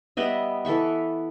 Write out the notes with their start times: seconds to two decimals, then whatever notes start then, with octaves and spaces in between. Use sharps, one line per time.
0.17 G3 B3 D#5 E5
0.65 E3 A4 E5 C#6